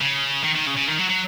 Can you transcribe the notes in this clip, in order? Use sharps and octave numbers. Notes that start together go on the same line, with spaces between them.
C#3
D#3
D#3
C#3
C#3
D#3
F#3
F#3